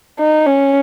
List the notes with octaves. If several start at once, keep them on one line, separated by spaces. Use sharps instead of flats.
D#4
C#4